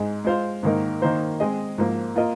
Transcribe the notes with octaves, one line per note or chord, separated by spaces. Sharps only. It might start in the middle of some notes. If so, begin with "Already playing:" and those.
Already playing: G#2 G#3 D#4 G#4
G#3 F4 C5 F5
G#2 D#3 A#3 D#4 A#4
D#3 A#3 D#4 C5
G#3 C4 G#4 D#5
G#2 F3 A#3
A#3 F4 A#4 D#5